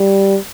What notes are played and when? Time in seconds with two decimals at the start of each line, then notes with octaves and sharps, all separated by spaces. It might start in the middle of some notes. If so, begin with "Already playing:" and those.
Already playing: G3